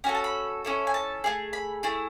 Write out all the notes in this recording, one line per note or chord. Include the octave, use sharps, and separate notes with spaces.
C#4 F#4 A4 G#5
A5
B5
C#4 E4 A4
G#5
A5
A3 E4 G#4
B5
A3 E4 G#4